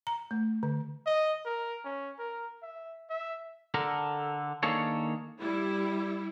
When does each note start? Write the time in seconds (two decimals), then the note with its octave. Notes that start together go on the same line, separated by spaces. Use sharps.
0.07 A#5
0.31 A3
0.63 D3
1.06 D#5
1.45 A#4
1.84 C#4
2.19 A#4
2.62 E5
3.09 E5
3.74 D3 A4 A#4
4.63 D#3 A#3 D4 G#4 A4 C#5
5.41 G3 E4